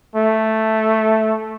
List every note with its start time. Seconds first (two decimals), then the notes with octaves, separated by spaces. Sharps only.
0.16 A3